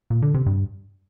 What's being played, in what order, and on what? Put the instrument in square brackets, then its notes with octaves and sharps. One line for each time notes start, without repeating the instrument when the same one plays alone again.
[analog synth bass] A#2
D3
C3
G2